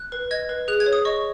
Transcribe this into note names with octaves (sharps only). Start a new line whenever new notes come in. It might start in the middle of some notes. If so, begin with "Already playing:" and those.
Already playing: F#6
B4
D#5 G#6
B4
G#4 F#6
G#6
C#5
D#6
D#5 C#6